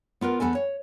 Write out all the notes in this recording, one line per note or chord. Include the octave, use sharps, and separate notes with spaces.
B3 F4 A#4 B4
E2 A#2 B3 A4 G#5
C#5